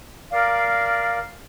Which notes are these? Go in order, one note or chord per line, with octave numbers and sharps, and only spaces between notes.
A#4 D5 F5